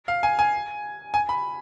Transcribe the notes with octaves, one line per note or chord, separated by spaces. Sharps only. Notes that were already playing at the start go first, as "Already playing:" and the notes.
F5
G#5
G#5
G#5
B5